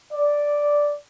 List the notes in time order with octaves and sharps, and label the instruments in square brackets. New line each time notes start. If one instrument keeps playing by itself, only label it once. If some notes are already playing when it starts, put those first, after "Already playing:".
[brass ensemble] D5